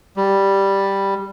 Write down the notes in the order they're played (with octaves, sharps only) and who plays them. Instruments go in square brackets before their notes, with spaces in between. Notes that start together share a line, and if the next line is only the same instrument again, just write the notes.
[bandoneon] G3